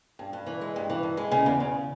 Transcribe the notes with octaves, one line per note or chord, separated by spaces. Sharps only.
G2
G2
E3
G#3
G2
E3
G2
G#3
C#3
E2
C#3